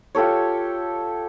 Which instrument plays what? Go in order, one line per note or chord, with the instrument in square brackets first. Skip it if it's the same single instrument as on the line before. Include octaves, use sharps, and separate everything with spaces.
[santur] F4 G4 A4 C#5